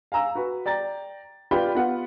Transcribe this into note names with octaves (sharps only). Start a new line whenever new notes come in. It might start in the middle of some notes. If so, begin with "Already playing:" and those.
F5 G#5 A#5 E6
F#4 B4
D5 G5 A#5 A6
F4 G4 B4 D5 G5 B5
B3 F4 G4 B4 F#5